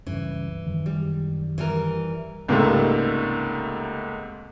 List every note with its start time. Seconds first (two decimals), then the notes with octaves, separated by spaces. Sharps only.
0.07 C#2 G2 E3 C#4
0.66 F#2 D#3
0.86 G3
1.58 E3 G3 A#4
2.48 C#2 G#2 C3 G3 A3 A#3